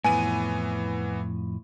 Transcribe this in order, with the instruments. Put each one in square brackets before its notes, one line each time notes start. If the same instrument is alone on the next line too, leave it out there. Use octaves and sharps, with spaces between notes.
[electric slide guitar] F2 A2 [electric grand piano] E3 B3 D#7 [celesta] G#5